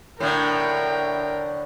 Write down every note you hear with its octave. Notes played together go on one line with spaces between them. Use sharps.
A2 D3 A#4 G5